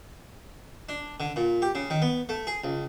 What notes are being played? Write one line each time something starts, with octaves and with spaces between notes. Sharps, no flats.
D4
D3
A#2
G4
C#3
D#3
B3
A3
G#4
C#2